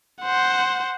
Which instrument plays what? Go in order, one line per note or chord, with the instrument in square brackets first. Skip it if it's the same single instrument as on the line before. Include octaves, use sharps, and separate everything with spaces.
[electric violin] C5 F#5